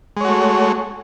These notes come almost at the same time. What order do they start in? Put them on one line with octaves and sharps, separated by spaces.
G#3 C#5 F#4 A3